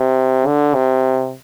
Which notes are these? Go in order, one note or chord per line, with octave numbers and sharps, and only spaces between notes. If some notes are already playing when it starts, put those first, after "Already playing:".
Already playing: C3
D3
C3